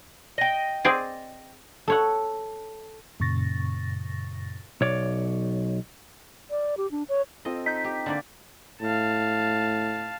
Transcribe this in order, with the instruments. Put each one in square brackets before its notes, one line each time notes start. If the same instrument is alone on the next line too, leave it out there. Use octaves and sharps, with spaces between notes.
[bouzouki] D#5 G5
[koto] C4 G#4 D5
[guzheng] A4 C#5 F#5
[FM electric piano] F#2 A#2 C#3 C#6 A6 A#6
[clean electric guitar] B1 C#5 D5
[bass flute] D5
G4
D4
C#5
[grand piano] C4 F4 A4 [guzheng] D#5
[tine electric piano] D#4 [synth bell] G6 B6
[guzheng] G4
D3 A#3 D5
[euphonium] A2 [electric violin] F5 A5